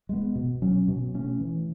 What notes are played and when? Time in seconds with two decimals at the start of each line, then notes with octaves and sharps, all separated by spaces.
0.09 G#3 B3
0.35 B2
0.62 F#3 C#4
0.88 B2
1.14 A3 C#4
1.40 E3